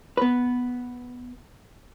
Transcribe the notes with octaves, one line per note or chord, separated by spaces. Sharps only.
B3 B4